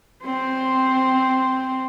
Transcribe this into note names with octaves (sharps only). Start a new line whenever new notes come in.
C4 C5